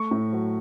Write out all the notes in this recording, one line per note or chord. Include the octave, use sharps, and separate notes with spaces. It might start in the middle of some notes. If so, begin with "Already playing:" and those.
Already playing: A3 C#6
A2
F#3